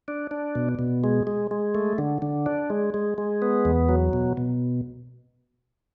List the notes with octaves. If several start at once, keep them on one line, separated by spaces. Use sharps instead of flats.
D4
D4
B2
B2
G#3
G#3
G#3
A3
D3
D3
D4
G#3
G#3
G#3
B3
E2
F#3
B2
B2